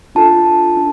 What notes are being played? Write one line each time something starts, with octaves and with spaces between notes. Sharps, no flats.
D4 F4 A4 A5
D4